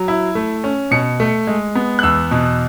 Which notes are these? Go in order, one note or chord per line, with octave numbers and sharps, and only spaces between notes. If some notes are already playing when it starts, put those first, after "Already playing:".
Already playing: F#3
E4
A3
C#4
B2 C#7
A3
G#3
B3
F#6
E2 E6
B2